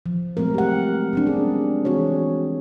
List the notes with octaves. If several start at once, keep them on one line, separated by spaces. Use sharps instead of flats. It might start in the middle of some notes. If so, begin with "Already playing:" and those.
F3
F#3 G#3 A3 C4 A#4
G4 F#5
G3 C4 D4
G#3 C#4 G#4
E3 C4 F#4 G#4 C#5